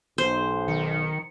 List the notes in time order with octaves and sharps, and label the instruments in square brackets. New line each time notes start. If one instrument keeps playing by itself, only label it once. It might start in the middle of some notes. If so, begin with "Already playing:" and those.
[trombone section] B1 [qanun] C5
[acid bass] D#3 [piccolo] C#7